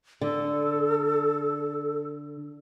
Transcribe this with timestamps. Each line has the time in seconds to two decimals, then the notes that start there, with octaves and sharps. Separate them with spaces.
0.21 D3 A4